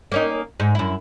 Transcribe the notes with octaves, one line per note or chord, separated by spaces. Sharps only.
A#3 C#4 D#4
G#2
F#2 E4